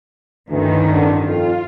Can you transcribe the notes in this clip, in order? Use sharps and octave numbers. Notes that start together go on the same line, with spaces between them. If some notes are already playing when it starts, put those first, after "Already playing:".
D2 G2 D#3 E3 C#4
A1 D3
F2 F4